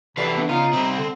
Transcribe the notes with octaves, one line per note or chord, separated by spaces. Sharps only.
C3 E3 F#4 A4 B4 D5 E6 C7
B3 D4
C#3 D#4 F4 D#7
C3 G3 C4
D3